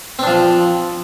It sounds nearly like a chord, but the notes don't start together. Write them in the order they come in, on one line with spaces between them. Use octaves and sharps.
C4 D4 F3